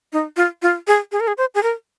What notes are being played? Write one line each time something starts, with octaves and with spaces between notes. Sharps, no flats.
D#4
F4
F4
G#4
G#4
A#4
G#4
C5
G#4
A#4